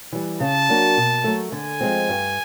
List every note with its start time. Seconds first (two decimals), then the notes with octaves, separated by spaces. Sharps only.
0.13 E3 G3
0.40 C#3 A5
0.69 F#3 A#3 D4 F#4
0.97 B2
1.24 F#3 A3
1.52 D3 G#5
1.81 F3 G#3 C4
2.09 G2